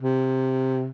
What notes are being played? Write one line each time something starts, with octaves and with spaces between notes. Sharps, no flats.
C3